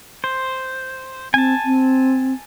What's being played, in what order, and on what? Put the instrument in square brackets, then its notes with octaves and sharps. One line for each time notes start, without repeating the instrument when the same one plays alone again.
[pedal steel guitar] C5
[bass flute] C4 [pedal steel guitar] G#5 A5
[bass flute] C4